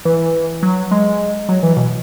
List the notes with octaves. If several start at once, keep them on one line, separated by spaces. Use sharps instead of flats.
E3
F#3
G#3
F#3
E3
B2